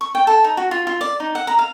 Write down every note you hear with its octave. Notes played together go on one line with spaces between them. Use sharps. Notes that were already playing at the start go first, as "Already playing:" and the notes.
C#6
G5
A4
D#4
F#4
F4
F4
D5
D#4
F#5
A#5
F5